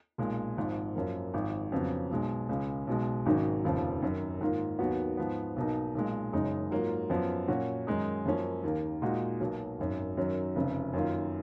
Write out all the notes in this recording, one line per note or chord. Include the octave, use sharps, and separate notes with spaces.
B1 A#2 G#3
G#1 G#2 F3
F#2 F3 A#3
G#1 G#2 F3
F2 C#3 F#3 B3
B1 B2 G#3
C#2 C#3 G#3
B1 B2 G#3
G#1 G#2 D#3 F#3 C#4
F1 D#2 C#3 F3
F#2 D#3 F#3
G#2 D#3 A#3 F4
D#2 D#3 F#3 B3 F#4
G#2 F3 B3
B1 B2 A#3 D#4
B1 A#2 G#3
F#1 F#2 C#3 G#3 D#4
G#2 F#3 A#3 F4
F#2 F3 B3
A#2 F#3 C#4 F#4
F#2 D#3 G#3 D#4
F#2 F3 A#3 C#4
D#2 D#3 A#3
A#2 G#3 D#4 F#4
B1 B2 F#3 A#3
G#1 F#2 D#3
F#2 D#3 F#3
F1 F2 C#3
F#2 D#3 A#3 F4